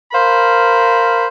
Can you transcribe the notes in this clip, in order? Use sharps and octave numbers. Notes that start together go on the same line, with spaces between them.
A#4 C5 F5 B5